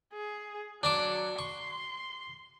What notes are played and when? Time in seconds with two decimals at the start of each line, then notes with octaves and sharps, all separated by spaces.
0.13 G#4
0.83 F#3 D4 A5 D6
1.39 C6 C#6